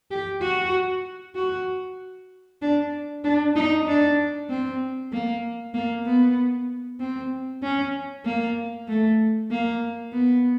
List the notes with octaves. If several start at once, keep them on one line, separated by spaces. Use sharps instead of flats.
G4
F#4
F#4
D4
D4
D#4
D4
C4
A#3
A#3
B3
C4
C#4
A#3
A3
A#3
B3